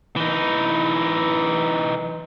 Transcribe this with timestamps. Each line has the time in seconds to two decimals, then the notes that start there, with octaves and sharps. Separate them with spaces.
0.16 E3 D#4